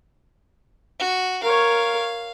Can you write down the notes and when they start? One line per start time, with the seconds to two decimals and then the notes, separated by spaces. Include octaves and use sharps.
0.99 F#4
1.44 A#4 C#5 F5